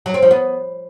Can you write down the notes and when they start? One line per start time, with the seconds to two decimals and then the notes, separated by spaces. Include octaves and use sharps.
0.06 F#3
0.14 C4
0.22 F3
0.31 B3